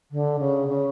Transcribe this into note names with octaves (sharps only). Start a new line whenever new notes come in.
D3
C#3
C#3